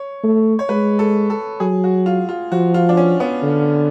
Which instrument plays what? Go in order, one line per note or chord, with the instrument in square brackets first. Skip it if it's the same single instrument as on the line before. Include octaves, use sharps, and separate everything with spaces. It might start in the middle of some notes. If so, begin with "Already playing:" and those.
Already playing: [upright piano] C#5
[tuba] A3
[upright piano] C#5
[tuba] G#3 [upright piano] B4
[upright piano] A4
A4
[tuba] F#3 [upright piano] G#4
[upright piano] F#4
F4
F4
[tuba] F3 [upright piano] F#4
[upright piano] F4
D4
C#4
B3
[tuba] D3